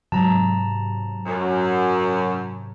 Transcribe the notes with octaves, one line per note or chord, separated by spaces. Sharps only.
G#2 C3 F#3 A5 A#5
F#2